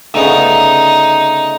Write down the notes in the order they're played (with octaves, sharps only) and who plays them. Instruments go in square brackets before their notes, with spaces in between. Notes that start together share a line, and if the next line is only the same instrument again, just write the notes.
[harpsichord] D2 C#3 B3 [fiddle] D#4